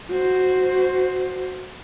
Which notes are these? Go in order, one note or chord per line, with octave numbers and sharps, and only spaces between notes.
F#4 C5